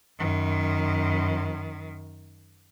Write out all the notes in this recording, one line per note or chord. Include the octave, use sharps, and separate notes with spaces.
F#2 D#3